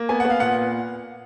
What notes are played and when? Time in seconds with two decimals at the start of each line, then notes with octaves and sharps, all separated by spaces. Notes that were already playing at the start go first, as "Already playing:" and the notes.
Already playing: A#3
0.09 B3 G#5
0.20 F#5
0.25 B3
0.30 F5
0.40 A#2 F#5